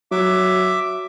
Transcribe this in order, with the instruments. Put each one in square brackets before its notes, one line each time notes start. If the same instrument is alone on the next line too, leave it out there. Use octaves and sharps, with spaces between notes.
[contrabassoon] F#3 [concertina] E5 D6